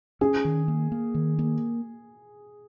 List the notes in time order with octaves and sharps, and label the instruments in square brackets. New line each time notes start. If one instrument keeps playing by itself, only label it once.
[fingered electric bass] C#4 [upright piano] G#4
[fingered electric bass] D#3
A#3
A#3
D#3
A#3